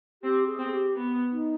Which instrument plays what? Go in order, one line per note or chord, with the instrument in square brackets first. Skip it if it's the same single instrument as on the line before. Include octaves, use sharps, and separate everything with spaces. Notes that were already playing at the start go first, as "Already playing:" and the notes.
[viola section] C4 [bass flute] G4
[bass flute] G#4
[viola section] C4
[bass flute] G4
[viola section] B3
[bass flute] D#4